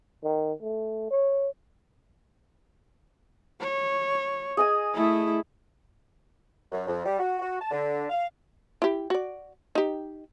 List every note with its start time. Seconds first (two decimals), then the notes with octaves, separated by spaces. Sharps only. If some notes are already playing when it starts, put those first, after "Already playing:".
0.23 D#3
0.62 A3
1.10 C#5
3.60 C#5
4.57 G#4 D#5 G#5
4.94 A3 E4
6.72 F#2
6.87 F2
7.05 G3
7.19 F#4
7.39 F#4
7.59 A5
7.71 D3
8.10 F5
8.82 E4 G4
9.10 F#4 D5
9.75 D#4 G4